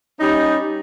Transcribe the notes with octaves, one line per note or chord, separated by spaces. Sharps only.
G3 C#4 D#4